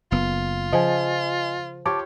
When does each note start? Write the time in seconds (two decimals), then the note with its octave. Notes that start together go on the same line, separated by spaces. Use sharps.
0.12 F#1 B3 F4
0.73 C#3 F3 D#5 G#5
1.86 F4 G4 C#5 A5 D6